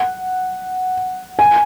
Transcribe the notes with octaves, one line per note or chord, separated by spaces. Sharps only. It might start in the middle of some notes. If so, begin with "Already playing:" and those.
Already playing: F#5
G#5